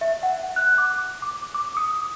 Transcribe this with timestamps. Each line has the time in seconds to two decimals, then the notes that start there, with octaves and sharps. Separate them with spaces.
0.01 E5
0.23 F#5
0.56 F#6
0.78 D6
1.22 D6
1.55 D6
1.77 D#6